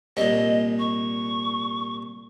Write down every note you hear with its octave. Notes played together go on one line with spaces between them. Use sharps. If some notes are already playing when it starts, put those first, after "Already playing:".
C2 A#2 D#5
C#6